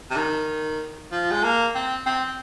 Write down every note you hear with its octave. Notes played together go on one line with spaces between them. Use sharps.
C3
D#3
F3
G#3
A#3
C4
C4